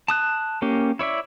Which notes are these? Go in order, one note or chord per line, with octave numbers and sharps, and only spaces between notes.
A5 D#6 F#6
A#3 C#4 G4
E4 C#5 D5 E5